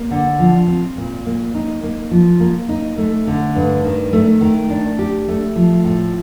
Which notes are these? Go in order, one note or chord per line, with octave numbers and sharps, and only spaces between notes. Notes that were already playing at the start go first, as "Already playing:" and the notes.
Already playing: A#3
D3
F3
C4
A#2
A#3
D#4
A#3
F3
A#3
D#4
A3
D3
G2
D#3
A3
D#3
D4
G4
A3
F3
A2